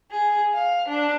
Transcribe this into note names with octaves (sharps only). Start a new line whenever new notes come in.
G#4
F5
D4